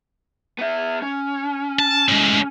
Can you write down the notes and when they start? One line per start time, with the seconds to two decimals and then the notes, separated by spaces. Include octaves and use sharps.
0.59 B3 E5
1.02 C#4
1.79 A5
2.09 A2 G#3